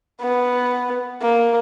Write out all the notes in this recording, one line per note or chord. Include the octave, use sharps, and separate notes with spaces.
B3
A#3